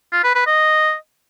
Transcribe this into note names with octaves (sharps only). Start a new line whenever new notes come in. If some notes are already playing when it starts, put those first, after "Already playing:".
F4
B4
B4
D#5